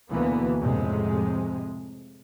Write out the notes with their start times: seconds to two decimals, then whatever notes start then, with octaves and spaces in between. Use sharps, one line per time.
0.11 D2 B2 E3 A#3 B3
0.58 F2 A2 C3 G#3